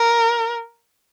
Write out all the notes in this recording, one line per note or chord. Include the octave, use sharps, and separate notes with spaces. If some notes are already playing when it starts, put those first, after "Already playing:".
Already playing: A#4